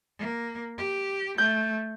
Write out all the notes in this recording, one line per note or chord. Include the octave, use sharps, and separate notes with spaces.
A#3
G4
A3 G6